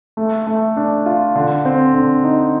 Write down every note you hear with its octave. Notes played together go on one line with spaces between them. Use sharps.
A3
A3
D4
F4
D3
C4
D3
D#4